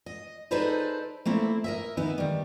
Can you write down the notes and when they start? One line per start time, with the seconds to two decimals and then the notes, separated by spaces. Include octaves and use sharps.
0.06 D#5
0.51 D#4 G#4 A4 B4 C5 D5
1.25 A3 A#3 C4 E4
1.64 A#4 D#5 E5
1.97 D#3 E3 B3 D#4 E4
2.18 D#3 G3